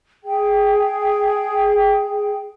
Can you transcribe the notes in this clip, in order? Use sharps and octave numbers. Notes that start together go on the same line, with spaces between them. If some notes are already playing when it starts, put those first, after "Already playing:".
G#4 G5